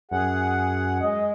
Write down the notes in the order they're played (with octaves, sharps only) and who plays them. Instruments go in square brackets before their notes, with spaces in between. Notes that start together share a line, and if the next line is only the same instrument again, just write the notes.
[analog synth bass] F#2 [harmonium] G#4 F#5
[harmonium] G#3 [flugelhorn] D#5